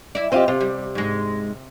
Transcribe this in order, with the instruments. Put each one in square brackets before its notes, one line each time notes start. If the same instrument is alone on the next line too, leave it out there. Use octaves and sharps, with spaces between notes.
[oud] E4 D5
[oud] E2 D#5 [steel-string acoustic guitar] C4 F4 G4
[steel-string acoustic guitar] C3 [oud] F4
[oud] G3
G#2 G#3